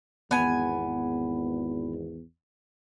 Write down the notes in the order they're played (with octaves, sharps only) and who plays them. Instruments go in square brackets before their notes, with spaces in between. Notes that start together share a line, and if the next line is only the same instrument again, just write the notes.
[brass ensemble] G#1 E2 [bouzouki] B3 G#5